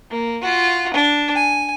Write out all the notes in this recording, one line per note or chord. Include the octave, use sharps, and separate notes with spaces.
A#3
F4 F#4
D4
G#5